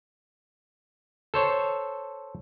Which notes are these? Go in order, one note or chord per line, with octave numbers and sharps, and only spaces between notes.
A4 C5 C#5